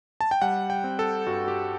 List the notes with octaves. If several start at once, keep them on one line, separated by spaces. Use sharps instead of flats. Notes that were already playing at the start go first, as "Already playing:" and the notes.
A5
G5
G3 F#5
G5
C4
A4
G2 F#4
G4